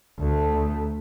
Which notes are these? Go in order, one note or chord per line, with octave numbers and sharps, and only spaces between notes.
D2 A3